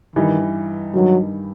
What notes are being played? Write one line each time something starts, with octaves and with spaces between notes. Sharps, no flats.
G2 D#3 E3 G3 D#4
G2 D#3 F#3 G3 D#4